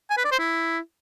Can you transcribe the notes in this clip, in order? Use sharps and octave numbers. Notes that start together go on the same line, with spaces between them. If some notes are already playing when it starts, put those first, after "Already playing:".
G#5
B4
D5
C5
E4